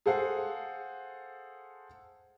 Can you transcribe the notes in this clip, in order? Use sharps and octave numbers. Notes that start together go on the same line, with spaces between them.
G#4 A4 C5 F5 F#5